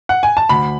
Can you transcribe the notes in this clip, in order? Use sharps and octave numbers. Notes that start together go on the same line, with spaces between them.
F#5
G#5
A5
D2 B5